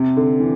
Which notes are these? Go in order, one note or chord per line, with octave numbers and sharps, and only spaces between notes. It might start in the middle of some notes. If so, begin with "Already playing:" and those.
Already playing: C3
D3
E3